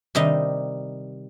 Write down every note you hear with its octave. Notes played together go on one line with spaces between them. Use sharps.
C3 D#3 G3 D#4